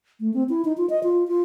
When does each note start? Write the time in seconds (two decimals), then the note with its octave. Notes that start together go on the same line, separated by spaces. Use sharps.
0.20 A3
0.34 C4
0.49 E4
0.65 D#4
0.77 F4
0.90 D#5
1.03 F4
1.28 F4